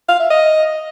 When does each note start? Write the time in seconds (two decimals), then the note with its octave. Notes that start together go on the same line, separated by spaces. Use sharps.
0.09 F5
0.20 E5
0.30 D#5